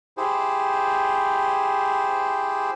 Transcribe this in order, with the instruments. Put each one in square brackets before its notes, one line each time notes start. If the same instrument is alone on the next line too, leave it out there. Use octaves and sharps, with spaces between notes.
[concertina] E4 G4 G#4 C5